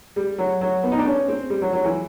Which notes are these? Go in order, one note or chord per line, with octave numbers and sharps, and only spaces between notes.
G3
F#3
F#3
B3
D#4
D4
C#4
C4
G3
F#3
F#3
E3